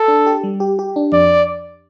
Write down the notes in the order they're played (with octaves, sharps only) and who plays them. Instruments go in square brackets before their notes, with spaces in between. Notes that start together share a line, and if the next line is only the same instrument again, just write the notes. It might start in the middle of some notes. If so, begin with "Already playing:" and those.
Already playing: [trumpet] A4
[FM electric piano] D4
G4
G3
G4
G4
D4
[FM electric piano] F2 [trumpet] D5